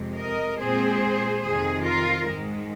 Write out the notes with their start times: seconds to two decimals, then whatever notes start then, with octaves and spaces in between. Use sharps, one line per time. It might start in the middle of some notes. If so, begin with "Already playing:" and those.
Already playing: F2 C3 G#3
0.17 A#4 D#5
0.59 A#2 G#3 C4 G#4 C5
1.43 F2 C3 D#3 G#4
1.85 F4 A#4
2.27 G#2 D#3 G#3